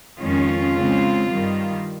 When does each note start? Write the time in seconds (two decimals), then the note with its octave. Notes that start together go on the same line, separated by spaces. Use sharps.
0.22 F2 D#3 G#3 C#4 F4
0.76 C#3 G#3 C4
1.31 G2 D#3 G3